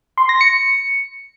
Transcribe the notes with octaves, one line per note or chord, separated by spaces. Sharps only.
C6
A#6
C#7